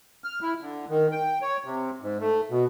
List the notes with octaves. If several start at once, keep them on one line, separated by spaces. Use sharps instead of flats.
F6
E4
D3
D#3
G5
C#5
C3
G#2
A3
B2